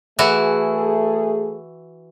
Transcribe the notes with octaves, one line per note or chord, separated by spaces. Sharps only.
E3 A3 E4 F#4 G#4